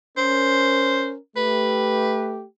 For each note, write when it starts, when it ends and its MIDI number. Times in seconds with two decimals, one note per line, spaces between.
0.17 1.17 61
0.17 1.17 70
0.17 1.12 72
1.37 2.44 57
1.37 2.44 67
1.37 2.36 71